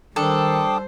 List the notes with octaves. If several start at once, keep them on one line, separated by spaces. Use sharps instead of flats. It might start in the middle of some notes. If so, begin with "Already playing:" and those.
D#3 G3 D4 A4 C5 G5 D6 D#6